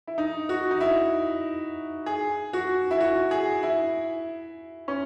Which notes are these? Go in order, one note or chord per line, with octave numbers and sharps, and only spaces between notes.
E4
D#4
F#4
D#4
E4
G#4
F#4
E4
F#4
G#4
E4
C#4